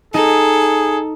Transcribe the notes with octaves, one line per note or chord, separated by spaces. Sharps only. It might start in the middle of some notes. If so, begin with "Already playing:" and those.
D#4 G#4 A4